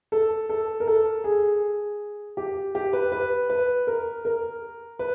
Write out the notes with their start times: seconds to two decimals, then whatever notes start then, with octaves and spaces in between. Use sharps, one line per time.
0.12 A4
0.49 A4
0.80 A#4
0.87 A4
1.24 G#4
2.37 G4
2.75 G4
2.93 B4
3.12 B4
3.50 B4
3.87 A#4
4.25 A#4
4.99 B4